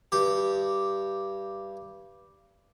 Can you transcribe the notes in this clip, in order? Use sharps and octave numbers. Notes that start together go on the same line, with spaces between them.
G2 G4